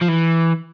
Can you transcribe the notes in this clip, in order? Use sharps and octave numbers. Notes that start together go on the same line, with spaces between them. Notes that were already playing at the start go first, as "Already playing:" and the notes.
F3
E3